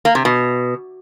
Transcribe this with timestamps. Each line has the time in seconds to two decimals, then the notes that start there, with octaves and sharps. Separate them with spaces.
0.05 A#3
0.15 C3
0.25 B2